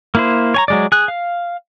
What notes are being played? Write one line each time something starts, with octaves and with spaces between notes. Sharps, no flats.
A#3 E4 C5
C#5 G#5 A#5
F#3 G#3 D5
G#4 F#6
F5